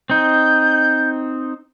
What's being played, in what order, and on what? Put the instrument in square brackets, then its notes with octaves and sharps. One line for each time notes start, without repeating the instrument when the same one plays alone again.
[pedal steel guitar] C4 D#4 [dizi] G6